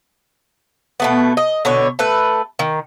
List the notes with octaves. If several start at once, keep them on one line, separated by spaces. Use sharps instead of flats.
B2 A3 B3
D#5
B2 D3 C#5
A3 A4 B4
D#3